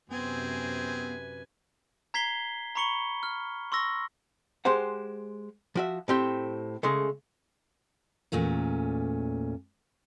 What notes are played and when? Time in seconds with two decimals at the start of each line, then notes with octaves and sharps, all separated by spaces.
0.12 F#2 C3 B3 C4 G#4 B4 G#5
2.14 A#5 G#6 B6 C7 G7
2.75 A#5 B5 C#6 C#7 G7
3.23 F6
3.72 C6 C#6 E6 A#6
4.65 G#3 G4 C5 F#5
5.75 F3 F#4 E5
6.08 A2 C4 G4
6.83 C#3 G#3 A3
8.32 E2 A#2 A3 C#4